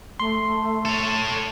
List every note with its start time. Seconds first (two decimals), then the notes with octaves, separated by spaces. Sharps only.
0.20 A3 C6
0.85 A4 C#5